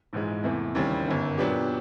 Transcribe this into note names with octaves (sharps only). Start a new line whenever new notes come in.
A#1 G#2 E3 G#3
E2 C3 E3 A3
D#2 C#3 E3 G3 C4
G1 F#2 D#3
A#2 F#3 B3 D4 G4